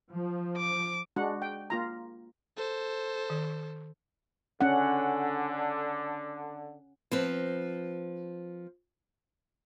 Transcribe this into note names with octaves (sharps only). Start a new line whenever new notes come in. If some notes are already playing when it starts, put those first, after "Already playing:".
F3
D6
G#3 D4 F#4 F#5
G5
A#3 F4 A#5
A4 C5
D#3
D3 C#4 F#5
F3 C4 B4